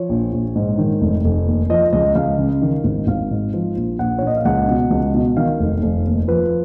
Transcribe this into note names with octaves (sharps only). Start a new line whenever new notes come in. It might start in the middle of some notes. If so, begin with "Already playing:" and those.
Already playing: F3 C#5
A#1
A#1
G#2
D#3
F1
F1
D#2
F3 D#5
C#2 D#5
C#2 F5
C#3
D#3
G#1
G#1 F5
G#2
F3
A#1
A#1 F#5
C#5
A#2 D#5
F5
C#2 F#5
B2
C#2
B2
D#3 F5
F1
F1
D#2
F3 B4